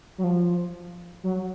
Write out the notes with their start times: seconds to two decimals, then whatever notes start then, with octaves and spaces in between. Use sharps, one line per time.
0.18 F#3
0.24 F3
1.24 F#3